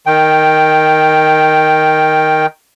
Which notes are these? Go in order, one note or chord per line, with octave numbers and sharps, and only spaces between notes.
D#3 G5